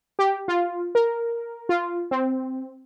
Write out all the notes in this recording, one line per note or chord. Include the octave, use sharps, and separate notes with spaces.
G4
F4
A#4
F4
C4